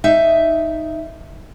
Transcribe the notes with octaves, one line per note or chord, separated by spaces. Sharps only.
D#4 E5